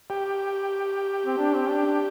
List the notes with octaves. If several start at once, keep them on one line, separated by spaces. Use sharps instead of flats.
G4
C4
D4
C4
D4
D4